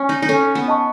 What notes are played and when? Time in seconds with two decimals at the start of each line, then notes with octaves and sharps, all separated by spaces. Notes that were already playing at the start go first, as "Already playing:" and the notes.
Already playing: C#4
0.09 D#4
0.22 D#4
0.29 C#4 A4
0.55 B3
0.68 D#5 A5 C#6